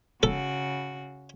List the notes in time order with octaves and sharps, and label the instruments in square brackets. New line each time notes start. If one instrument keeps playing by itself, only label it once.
[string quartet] C#3 F#4 [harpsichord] A4